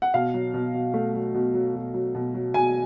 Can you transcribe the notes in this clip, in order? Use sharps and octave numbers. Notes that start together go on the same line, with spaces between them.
F#5
B2 F5
F#3
B2
B2
A3
F#3
B2
F#3
B2
F#3
B2
F#3
B2 G#5